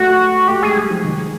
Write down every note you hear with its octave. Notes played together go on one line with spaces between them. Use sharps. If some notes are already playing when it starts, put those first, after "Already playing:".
Already playing: A3 F#4
A3 G4
G#3 G#4
G3
F3
D#3